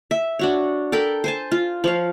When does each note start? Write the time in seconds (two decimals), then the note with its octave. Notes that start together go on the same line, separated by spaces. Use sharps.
0.11 E5
0.39 D4 F#4 C#5
0.92 A4 A#4 G5 B5
1.24 C5 G#5 A5
1.52 F4
1.84 F3 C#5 F5